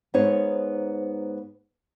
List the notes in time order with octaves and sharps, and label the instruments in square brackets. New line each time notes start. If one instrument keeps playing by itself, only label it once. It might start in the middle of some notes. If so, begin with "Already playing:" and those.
[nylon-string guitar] G#2 B3 D#4 C5 C#5